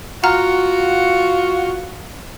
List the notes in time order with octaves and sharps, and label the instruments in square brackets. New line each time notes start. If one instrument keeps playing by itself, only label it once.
[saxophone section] F4 F#4 [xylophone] F#5 A#5 F6